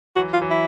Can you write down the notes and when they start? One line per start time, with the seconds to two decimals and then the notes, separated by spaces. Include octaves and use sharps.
0.16 E3 F#3 F#4
0.33 F4
0.41 E3 F#3
0.51 E4